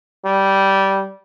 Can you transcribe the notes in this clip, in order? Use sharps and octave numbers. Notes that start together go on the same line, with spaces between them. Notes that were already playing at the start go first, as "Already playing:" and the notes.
G3